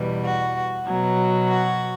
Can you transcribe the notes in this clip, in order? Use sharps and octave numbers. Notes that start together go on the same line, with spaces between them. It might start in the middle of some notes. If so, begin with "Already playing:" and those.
Already playing: E2 B2 G3
F#4
B2 F#3
F#4